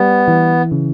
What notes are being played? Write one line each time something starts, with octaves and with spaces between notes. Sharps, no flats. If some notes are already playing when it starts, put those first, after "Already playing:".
Already playing: G3 B3
E3
C#3